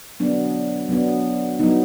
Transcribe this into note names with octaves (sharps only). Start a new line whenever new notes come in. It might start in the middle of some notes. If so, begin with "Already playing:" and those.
F#3 B3 D4
F#3 B3 D4
F#3 B3 D#4